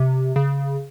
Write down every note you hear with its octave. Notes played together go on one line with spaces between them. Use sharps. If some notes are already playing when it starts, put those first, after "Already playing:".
Already playing: C3
C#3